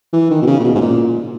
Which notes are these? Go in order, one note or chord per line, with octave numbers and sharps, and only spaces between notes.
E3
D#3
B2
C#3
A#2
B2
G#2
A#2